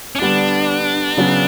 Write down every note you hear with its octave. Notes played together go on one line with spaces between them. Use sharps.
C#4
D3 G3 B3 D4
C#3 F#3 B3